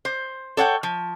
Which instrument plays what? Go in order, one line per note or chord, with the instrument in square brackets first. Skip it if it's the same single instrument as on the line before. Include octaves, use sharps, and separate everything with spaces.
[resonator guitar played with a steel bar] C5
A4 C#5 F#5 G5
F3